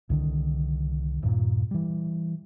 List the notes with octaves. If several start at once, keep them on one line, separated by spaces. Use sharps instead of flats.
C2 D3 D#3
D#1 G2 A#2
E3 G3